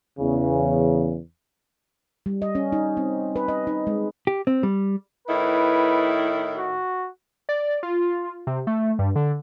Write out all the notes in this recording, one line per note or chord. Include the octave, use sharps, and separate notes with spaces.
E2 C#3
G3
D#5
C#4
D#4
C4
B4
D#5
D#4
G#3
G4
C4
G3
A2 D#3 E4 B4
F#4
D5
F4
C3
A3
G2
D3